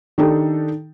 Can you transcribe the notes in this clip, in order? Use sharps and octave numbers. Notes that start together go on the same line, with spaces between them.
D#3 D4 D#4 G4 A4